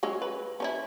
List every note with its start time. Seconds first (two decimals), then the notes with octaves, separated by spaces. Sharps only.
0.03 F#3 G#3 C#4
0.22 B4
0.60 C#4 D#4 E4